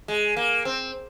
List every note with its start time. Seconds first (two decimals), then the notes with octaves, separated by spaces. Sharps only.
0.08 G#3
0.36 A#3
0.65 C4